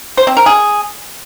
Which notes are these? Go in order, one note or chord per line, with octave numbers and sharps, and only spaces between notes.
C5
C4
A#4
G#4